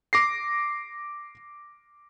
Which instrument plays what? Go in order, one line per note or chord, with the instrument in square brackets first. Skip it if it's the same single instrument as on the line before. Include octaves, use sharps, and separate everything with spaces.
[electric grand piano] D6 A#6 C7